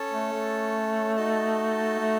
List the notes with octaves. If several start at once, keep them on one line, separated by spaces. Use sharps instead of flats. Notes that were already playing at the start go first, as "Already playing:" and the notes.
Already playing: C#4 A4 C#5 A5
A3
A3
D#4 F#4 A4 D#5 A5
A3